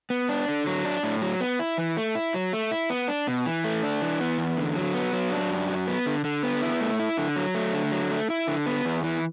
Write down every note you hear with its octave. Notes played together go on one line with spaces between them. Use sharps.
B3
D4
D3
F#3
D4
A2
F#3
B3
E4
E3
A3
E4
F#3
A3
E4
B3
D4
B2
E3
A3
D4
E3
B3
E2
D3
F#3
B3
F#3
D4
F#2
F#3
B3
D3
D3
B3
E4
A3
E4
D3
F#3
A3
D3
F#3
A3
E4
D3
B3
E2
E3